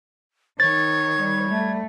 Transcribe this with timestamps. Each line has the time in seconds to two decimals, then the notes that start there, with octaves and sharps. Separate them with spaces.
0.60 D#3 C#5 G#6 A6
1.19 G3
1.50 A3